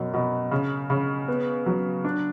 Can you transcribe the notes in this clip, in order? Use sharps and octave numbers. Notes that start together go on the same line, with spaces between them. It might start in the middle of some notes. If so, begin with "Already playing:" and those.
Already playing: F#2 B2
B2
C#3
C#3
B3
F#3
D4